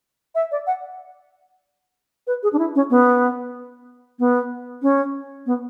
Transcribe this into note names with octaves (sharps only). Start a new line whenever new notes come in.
E5
D5
F#5
B4
G#4
D4
E4
C#4
B3
B3
C#4
B3